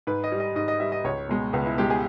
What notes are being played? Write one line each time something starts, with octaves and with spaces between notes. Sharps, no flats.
G#2 B4
D#5
G3
D#5
G#2 D#5
D#5
G3 E5
D#5
C#2 C#5
B2 G#3
C#2 B4
E4
B2 G#3 G4
G#4